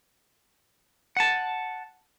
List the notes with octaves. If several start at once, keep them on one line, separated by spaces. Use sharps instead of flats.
F#5 A5